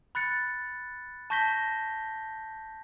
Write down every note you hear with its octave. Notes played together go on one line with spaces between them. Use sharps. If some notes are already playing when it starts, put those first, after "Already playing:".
B5 F#6 A6 C#7
A5 C#6 G6 A#6 B6 G7